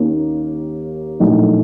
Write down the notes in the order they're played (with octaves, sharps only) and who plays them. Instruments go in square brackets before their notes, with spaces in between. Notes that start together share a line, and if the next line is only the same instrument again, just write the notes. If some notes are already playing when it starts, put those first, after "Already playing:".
Already playing: [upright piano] D#2 D#3 A#3 C#4
A#1 A2 F#3 A3 D#4